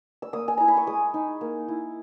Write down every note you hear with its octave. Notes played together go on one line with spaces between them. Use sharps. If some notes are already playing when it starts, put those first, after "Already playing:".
E6
A#3 D#6
G#5
E4 A#5
B5
C#6
G#3 D#6
D#4
A#3
E4